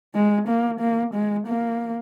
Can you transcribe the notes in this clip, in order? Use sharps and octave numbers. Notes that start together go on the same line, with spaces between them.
G#3
A#3
A#3
G#3
A#3